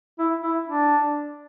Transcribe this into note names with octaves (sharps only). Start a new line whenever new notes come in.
E4
E4
D4